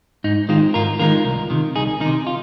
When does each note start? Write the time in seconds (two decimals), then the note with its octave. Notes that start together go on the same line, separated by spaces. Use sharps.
0.24 G#2 D#4
0.49 D#3 G#3 C4 D#4 F4
0.74 G#2 F4 A#4
0.99 D#3 G#3 C4 D#4 F4 A#4
1.25 C2
1.50 C3 D#3
1.75 C2 D#4 G#4
2.00 D#3 D#4
2.06 C3
2.27 F4